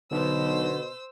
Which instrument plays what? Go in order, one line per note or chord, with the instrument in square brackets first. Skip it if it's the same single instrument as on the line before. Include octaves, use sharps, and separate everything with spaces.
[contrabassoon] B1 [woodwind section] B2 [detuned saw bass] D3 [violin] C5 E6